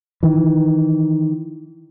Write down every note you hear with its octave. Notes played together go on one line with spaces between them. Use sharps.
D#3 E3